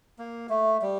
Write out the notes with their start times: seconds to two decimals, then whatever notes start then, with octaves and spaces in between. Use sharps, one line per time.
0.19 A#3
0.49 A3
0.82 G3